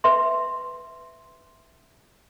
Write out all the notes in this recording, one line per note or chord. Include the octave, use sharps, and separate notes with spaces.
B4 E5 C6